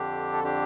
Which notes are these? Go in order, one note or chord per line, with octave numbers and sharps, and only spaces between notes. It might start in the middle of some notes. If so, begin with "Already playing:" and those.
Already playing: F2 D3 D4 G4
A4
D4 G4